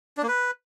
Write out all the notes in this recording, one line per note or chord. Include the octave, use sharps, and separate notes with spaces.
D4
A#3
B4